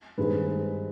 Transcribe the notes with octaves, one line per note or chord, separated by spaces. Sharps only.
G2 D#3 G#3 C4 B4